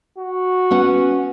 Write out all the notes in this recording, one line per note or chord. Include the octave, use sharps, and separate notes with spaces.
F#4
B3 C#4 F#5